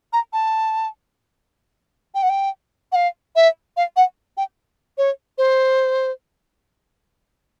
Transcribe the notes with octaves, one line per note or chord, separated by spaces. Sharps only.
A#5
A5
G5
F#5
G5
F#5
F5
E5
F5
F#5
G5
C#5
C5